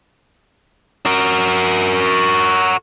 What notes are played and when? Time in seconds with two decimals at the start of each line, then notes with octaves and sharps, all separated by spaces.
1.06 F#4 A#4